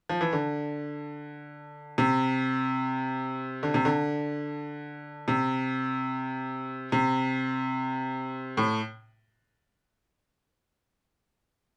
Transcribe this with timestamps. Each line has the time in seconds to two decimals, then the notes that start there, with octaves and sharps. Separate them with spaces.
0.09 F3
0.21 E3
0.33 D3
1.98 C3
3.63 D3
3.74 C3
3.85 D3
5.28 C3
6.92 C3
8.57 A2